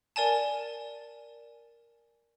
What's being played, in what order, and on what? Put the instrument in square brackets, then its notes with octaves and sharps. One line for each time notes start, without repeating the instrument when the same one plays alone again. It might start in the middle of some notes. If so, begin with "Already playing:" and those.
[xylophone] A#4 D5 G#5 A5